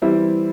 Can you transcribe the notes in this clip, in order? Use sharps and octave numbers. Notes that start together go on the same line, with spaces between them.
E3 G3 C4 E4